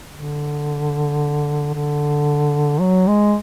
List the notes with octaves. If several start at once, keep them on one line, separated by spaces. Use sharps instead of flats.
D3
D3
F#3
G#3